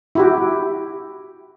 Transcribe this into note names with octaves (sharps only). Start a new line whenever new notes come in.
E4 F#4 G4